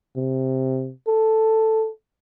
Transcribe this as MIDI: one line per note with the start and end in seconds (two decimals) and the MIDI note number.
0.16 0.91 48
1.07 1.89 69